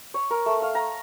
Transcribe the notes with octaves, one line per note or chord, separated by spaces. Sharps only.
C#5
A#4
A3
F5
A#5